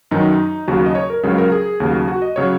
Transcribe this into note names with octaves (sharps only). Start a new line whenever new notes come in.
F#2 D#3 F#3 D#4
D#2 C#3 F#3 F#4
G#4
D#5
C#5
A#4
C#2 C#3 F#3 C#5
A#4
G#4
D#2 C#3 F#3
F#4
D#5
C#3 F#3 C#5